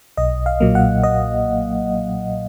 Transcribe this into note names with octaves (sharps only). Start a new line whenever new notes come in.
B1 D#5
F5
A#2 F#3 A#3
F#5
D#5